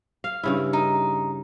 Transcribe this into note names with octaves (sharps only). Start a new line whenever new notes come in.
F5
G2 C#3 E4
D#4